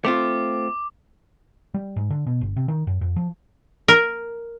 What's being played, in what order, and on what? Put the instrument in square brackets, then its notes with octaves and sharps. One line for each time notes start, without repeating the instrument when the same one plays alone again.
[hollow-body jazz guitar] A3 C4 F4 [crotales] D6
[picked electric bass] G3
G#2
D3
B2
G1
C3
D#3
F#2
F2
F3
[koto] A#4